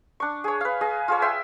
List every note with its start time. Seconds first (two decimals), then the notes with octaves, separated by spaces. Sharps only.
0.20 D4 C#6
0.44 G#4 C#5
0.61 B4 F5
0.81 G#4 D#5
1.08 F4 G#4 C#5
1.22 E5 G5 C6